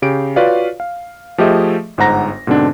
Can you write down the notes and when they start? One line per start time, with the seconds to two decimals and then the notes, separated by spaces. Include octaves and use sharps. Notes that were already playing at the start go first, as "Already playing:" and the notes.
0.02 C#3 G4 D7
0.36 F4 F#4 B4 C#5 D5 F5
0.80 F5
1.38 F3 A3 G4 G#4 D#5 E5
1.98 G1 G#2 C5 F#5 A#5 A#6
2.47 G#2 B2 D3 C4 D4